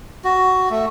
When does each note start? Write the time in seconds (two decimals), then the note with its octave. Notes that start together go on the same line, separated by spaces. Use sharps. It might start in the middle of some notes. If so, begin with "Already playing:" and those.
0.25 F#4
0.70 A3